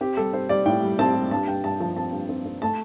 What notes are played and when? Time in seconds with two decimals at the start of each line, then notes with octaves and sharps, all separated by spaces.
0.01 C4 G4
0.17 G3 A4
0.33 C4 C5
0.49 G3 D5
0.66 A2 G5
0.82 G3
0.99 C4 A5
1.15 G3
1.31 G2 A5
1.48 G2 G5
1.64 G2 A5
1.80 F3 A5
1.96 C4 A5
2.13 G2
2.29 C4
2.46 C4
2.62 A3 A5